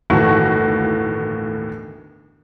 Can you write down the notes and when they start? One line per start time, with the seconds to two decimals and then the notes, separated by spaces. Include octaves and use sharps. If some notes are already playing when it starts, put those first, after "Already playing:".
0.10 G1 D#2 A2 E3 F#4 C#6